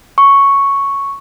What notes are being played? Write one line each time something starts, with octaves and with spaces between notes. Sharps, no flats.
C#6